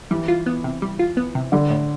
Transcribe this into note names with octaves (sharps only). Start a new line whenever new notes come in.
E3 G3
F4
B3
C3
G3
F4
B3
C3
D3 G3
A2